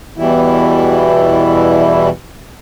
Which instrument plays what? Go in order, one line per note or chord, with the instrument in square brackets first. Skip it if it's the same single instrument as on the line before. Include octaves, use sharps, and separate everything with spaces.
[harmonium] E2 B2 E3 G3 E4